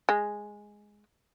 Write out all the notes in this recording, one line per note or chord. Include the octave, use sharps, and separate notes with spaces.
G#3